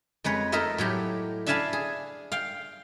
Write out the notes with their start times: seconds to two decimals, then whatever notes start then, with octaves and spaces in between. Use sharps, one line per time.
0.24 F2 G#3 B4 C#5
0.52 A3 D#4 A4 A#4 D#5 E5
0.78 A2 F#3 G4
1.46 D4 E5 F5 G#5 A5 B5
1.73 G#4
2.32 F5 G5